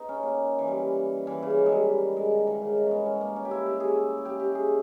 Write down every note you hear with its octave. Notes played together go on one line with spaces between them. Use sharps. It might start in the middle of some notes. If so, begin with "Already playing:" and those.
Already playing: B3 D#4
C#4
A#3
E3
G3
E3
C#3
E3
D#3
G#3
G3
G#3
D#3
D#3
C#3
D#3
B3 C#4
C#4
A#3
C#4
G4
E4
G4
G#4
G4
G4
G#4